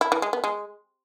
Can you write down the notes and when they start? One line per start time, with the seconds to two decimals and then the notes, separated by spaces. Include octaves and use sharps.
0.01 E4
0.12 E3
0.22 G#3
0.33 B3
0.44 G#3